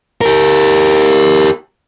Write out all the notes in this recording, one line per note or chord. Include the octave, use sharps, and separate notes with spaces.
G4 A#4